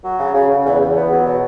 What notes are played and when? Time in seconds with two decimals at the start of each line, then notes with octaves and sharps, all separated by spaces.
0.04 F#3
0.19 C#3
0.34 C#3
0.49 C#3
0.65 E2
0.80 E2
0.95 B3
1.10 F#3
1.26 B2